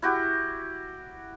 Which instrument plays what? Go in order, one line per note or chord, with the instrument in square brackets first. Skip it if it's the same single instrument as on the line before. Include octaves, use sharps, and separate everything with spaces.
[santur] E4 F#4 G4